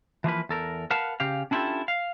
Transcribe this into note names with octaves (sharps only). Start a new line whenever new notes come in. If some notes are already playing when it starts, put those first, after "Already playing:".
E3 F3 A#3 B4
E2 A4 A#4
A#4 B4 F5 F#5 A5
C#3 G4 F5
C#4 D4 E4 F4 G4 A4
F5